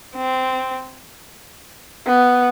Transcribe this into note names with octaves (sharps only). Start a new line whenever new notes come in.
C4
B3